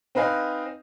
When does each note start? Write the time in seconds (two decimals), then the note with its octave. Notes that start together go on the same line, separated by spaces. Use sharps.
0.15 C4 D#4 B4 F5 G#5